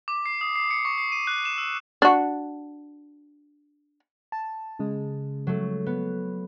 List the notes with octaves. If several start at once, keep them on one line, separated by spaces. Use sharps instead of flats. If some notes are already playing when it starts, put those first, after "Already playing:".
D6
C7
D#6
C7
C#7
C#6
C7
D#7
F#6
E7
E6
D4 F#4
A5
C#3 G#3
F#3 A3
B3